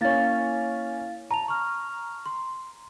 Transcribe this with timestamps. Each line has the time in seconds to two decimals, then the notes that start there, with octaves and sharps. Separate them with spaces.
0.01 A#3 C#4 E4 F5 A6
1.31 A5 A#5 F7
1.48 C#6 F6
2.26 C6